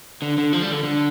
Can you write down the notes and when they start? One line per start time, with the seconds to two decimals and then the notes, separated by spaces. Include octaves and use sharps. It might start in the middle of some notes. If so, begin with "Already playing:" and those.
0.22 D3
0.38 D3
0.53 F3
0.62 G3
0.72 D3
0.83 D3